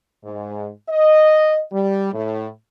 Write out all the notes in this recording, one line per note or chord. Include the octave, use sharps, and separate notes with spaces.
G#2
D#5
G3
A2